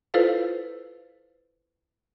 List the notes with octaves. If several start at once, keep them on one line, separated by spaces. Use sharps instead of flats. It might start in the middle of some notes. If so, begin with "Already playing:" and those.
E4 F4 A4 B4 C5 F5